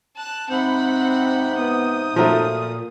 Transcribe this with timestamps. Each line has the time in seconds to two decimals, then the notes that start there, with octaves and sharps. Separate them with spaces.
0.16 A5 F#6
0.50 G#2 C3 C4 F#5 B5 G6
1.58 B3 D#6
2.16 A#2 F3 F#3 A3